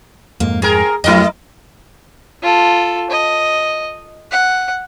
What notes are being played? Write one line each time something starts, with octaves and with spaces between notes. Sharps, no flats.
F2 G#2 A#3
C4 G#4 A#4
F2 F#3 A3 C4 E4 G4 A#4 D#5
F4 A4
D#5
F#5